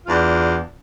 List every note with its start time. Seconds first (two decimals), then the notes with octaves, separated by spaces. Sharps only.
0.06 E2 D4 F4